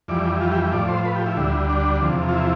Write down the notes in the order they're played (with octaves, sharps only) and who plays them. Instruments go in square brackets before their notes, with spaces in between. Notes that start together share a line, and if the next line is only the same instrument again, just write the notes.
[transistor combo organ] F2 E3 G3 D5
F4
G4
A2 F3 D5
C5
B4
G4
E4
D2 D3 G3
D4
E2 C3 F3
F4
E4